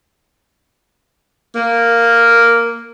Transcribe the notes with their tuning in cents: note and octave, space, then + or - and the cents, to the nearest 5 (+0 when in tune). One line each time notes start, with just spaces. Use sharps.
A#3 -5